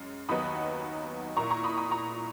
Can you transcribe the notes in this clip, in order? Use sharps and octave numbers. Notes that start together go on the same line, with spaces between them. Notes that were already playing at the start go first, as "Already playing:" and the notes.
Already playing: F#2 G#3 C#4
D#2 D#3 F#3 B3 D#4 B5 D#6
A#2 A#3 E4 A#5 C#6
A#5 C#6
B5 D#6
B5 D#6
A#5 C#6